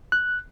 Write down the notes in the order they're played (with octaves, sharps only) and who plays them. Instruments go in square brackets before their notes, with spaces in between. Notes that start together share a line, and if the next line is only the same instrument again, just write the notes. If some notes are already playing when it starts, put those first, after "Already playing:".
[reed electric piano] F#6